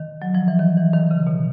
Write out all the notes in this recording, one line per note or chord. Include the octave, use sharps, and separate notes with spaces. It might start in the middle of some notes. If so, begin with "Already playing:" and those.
Already playing: D#3
F#3
F3
E3
D#3
E3
D#3
C#3
B2